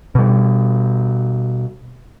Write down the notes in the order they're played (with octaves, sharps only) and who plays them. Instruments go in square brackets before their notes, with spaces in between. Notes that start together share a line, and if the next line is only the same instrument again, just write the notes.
[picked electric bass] B2 G3